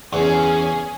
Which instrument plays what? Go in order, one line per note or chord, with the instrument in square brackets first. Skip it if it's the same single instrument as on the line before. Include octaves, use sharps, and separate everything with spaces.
[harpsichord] E2 [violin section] C#4 G#4